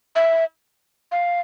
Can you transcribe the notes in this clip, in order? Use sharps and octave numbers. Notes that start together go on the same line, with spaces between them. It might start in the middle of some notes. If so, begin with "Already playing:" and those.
E5
F5